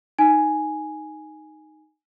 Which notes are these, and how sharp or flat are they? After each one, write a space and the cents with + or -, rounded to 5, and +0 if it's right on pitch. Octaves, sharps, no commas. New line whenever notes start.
D#4 +0 G#5 +0